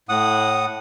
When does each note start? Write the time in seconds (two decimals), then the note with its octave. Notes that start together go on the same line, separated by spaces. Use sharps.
0.09 A2 F#5 D#6